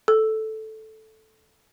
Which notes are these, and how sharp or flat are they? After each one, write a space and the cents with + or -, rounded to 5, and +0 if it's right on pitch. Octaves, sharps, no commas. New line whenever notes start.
A4 -5